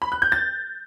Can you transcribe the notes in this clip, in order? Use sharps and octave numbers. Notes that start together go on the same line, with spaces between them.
B5
F#6
G6
A6